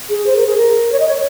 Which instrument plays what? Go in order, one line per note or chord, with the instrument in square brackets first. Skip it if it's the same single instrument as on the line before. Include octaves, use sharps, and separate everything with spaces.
[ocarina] G#4
C5
A#4
G#4
A#4
C#5
D#5
C#5